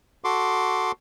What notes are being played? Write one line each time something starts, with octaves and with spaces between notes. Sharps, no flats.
F#4 A4 C6 D6